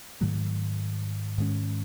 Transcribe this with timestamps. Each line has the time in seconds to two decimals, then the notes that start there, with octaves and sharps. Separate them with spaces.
0.21 G#2 D#3 F#3 A3
1.37 G#2 D#3 G#3 C#4